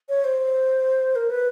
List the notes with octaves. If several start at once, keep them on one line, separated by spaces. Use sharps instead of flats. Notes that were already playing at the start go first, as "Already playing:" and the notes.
C#5
C5
A#4
B4